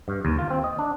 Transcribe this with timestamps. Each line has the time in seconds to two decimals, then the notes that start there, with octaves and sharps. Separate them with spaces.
0.08 G2
0.25 D#2
0.39 F4
0.50 C4
0.64 D#5
0.79 D4